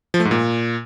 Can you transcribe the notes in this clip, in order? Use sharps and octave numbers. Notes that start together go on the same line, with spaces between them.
F3
A3
G#2
A#2